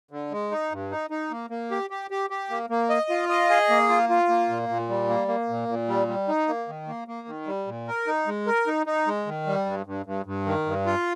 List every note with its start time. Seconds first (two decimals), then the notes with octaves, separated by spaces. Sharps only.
0.11 D3
0.32 G#3
0.51 D#4
0.72 G2
0.91 D#4
1.10 D#4
1.31 A#3
1.50 A#3
1.71 G4
1.90 G4
2.11 G4
2.30 G4
2.50 A#3
2.70 A#3
2.90 D#5
3.10 F4
3.29 D#5
3.50 G#4
3.70 A#3
3.89 F4
4.09 F4
4.29 A#3
4.49 A#2
4.69 A#2
4.89 G3
5.09 A#3
5.28 A#3
5.49 A#2
5.68 A#2
5.88 G3
6.08 G3
6.28 D#4
6.48 A#3
6.68 D#3
6.88 A#3
7.08 A#3
7.28 D#3
7.47 G3
7.67 A#2
7.87 A#4
8.07 D#4
8.27 G#3
8.46 A#4
8.67 D#4
8.86 D#4
9.07 G#3
9.26 D#3
9.47 G3
9.66 G2
9.86 G2
10.06 G2
10.26 G2
10.46 D#3
10.66 G2
10.86 F4